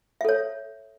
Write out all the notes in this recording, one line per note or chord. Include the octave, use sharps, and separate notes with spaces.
A4 C#5 E5